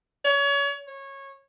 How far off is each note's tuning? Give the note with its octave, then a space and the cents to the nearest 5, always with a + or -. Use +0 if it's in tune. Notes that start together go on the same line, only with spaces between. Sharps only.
C#5 +30
C#5 -20